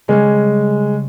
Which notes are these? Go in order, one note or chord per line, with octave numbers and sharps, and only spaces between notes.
C#3 G3 G#3 C#4